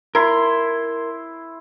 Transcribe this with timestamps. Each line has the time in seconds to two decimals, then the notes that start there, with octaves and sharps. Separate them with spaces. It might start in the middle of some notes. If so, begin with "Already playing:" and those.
0.15 E4 A#4 C6